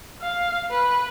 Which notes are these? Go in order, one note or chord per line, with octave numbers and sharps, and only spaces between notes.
F5
B4